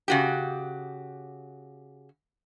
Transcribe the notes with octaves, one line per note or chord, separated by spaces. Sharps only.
C#3 F#4 G4